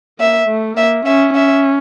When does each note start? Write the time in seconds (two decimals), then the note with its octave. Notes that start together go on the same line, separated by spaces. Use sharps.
0.20 A#3 E5
0.48 A3
0.77 A#3 E5
1.05 C#4 E5
1.34 C#4 E5